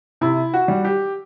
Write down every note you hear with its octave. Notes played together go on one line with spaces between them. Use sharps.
C3 E4
F#4
G3
G4